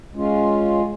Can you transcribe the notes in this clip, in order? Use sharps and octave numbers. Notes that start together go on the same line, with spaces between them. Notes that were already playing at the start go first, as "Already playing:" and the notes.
G#3 C#4 F4